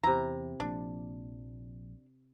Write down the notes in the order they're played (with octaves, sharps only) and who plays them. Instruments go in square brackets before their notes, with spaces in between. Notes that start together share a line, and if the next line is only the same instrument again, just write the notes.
[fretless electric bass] E2 [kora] C3 E4 [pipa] A#5
[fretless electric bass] A#1 F3 A#3 [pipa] D4